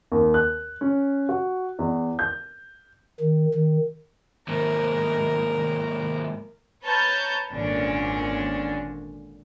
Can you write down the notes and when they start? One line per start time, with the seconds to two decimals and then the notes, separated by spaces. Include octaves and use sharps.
0.12 D#2
0.34 F#6
0.81 C#4
1.29 F#4
1.79 E2
2.19 G6
3.19 D#3
3.53 D#3
4.48 D#2 G#2 A#4
6.83 B4 C#5 A5 A#5 F6 G6
7.52 G#1 A#2 D3 C#4 D4